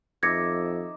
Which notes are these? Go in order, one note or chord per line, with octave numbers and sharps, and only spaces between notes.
F2 D#3 E5 D6 G#6 A#6 C#7